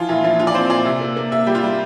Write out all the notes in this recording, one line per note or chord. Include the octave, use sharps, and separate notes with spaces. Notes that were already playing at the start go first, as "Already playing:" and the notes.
Already playing: E3 F3 F4
A#2 E4
F3 E4
F3 F4
D5
C4 C5
A#2 D5
C3
A#3
A#3
A#3 E5
G3 G4
F4
G3